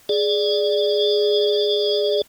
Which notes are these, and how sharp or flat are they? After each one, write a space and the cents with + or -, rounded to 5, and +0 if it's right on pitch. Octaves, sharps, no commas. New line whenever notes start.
G#4 +0 D5 +0